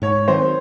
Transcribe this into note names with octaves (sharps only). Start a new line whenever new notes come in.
G#2 C#5
D#3 F#3 C4 C5